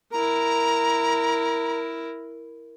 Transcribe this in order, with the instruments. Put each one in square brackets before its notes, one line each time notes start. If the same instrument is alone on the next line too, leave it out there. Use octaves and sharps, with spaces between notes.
[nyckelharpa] E4 A#4 [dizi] A#5